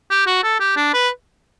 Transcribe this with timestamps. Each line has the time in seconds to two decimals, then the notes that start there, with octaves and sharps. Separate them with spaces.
0.11 G4
0.27 F#4
0.44 A4
0.60 G4
0.77 D4
0.94 B4